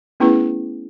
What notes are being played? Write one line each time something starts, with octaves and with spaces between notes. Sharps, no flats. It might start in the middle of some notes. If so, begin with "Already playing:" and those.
A3 B3 C#4 E4 G#4 B4